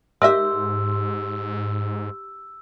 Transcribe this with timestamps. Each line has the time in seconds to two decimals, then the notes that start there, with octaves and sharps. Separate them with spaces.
0.22 G#2 G4 A#4 D#5 E5 C6 E6